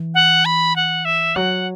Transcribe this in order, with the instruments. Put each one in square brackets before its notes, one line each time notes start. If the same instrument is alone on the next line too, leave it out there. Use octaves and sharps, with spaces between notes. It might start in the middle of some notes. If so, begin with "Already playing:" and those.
Already playing: [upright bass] E3
[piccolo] F#5
B5
F#5
E5
[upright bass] F#3 [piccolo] F#5